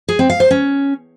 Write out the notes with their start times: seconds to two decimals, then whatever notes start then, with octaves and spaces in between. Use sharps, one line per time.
0.08 G#4
0.19 C4
0.30 F5
0.40 C5
0.51 C#4